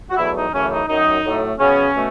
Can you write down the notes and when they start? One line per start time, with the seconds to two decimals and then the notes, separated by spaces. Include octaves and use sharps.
0.10 F#4
0.17 E2 B2 F#3 A3 E4
0.35 D#4
0.53 F#2 C#3 E3 A3 C#4
0.70 D#4
0.88 F#2 D#3 F#3 D#4
1.24 A2 F#3 A3
1.59 C#3 F#3 B3 C#4
1.95 B2 A3